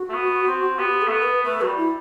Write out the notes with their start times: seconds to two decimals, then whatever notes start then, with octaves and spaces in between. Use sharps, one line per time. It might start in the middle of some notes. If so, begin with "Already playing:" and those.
Already playing: F#4
0.10 A3
0.14 B3
0.47 C4
0.79 B3 G4
1.02 A4
1.08 A3
1.12 B3
1.23 B4
1.44 A3 B4
1.61 F#3 G3 F#4
1.77 E4